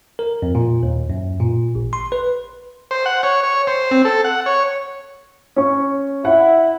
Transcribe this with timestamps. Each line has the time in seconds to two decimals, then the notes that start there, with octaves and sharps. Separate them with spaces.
0.19 A#4
0.42 F2
0.55 A#2
0.83 D#2
1.10 F#2
1.40 A#2
1.75 A1
1.93 C6
2.12 B4
2.91 C5
3.06 F#5
3.23 C#5
3.43 C#5
3.67 C5
3.91 C4
4.05 A4
4.24 F#5
4.46 C#5
5.56 C#4 C#6
6.25 E4 F#5